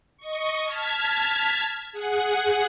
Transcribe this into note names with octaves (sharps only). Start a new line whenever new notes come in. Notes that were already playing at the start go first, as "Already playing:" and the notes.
D#5 C#6
A5 F6 G#6 B6
G#4 F#5